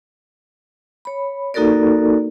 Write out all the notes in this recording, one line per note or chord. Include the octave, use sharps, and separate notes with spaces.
C#5 B5
A#3 D#4 F#4 A4 A#4 D5